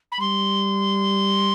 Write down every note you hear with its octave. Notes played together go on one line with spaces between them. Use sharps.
B5
G3 C6